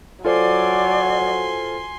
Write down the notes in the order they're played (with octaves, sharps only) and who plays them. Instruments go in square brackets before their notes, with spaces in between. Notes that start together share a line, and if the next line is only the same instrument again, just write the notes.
[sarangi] F#3 [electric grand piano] F4 A4 C5 [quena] D5 [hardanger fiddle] G#5 C6